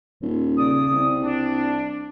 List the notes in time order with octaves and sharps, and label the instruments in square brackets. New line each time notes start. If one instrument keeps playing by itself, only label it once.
[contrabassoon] D#1
[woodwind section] C#3 D5 D#6
[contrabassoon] C2
[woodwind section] D4